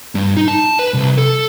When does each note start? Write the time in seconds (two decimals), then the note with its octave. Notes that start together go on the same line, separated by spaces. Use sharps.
0.15 G2
0.37 D#4
0.48 A5
0.79 B4
0.94 C2
1.18 A4